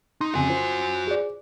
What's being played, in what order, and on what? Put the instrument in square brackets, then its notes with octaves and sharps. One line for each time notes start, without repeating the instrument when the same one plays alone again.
[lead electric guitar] D#4 [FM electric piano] C6
[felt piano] F2 C#3 [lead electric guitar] F#4 G#5
[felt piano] F4 C5
[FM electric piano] G#4 D5